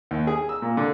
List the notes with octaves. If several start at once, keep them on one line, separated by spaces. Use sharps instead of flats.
D#2
G#4
E6
A#2
D3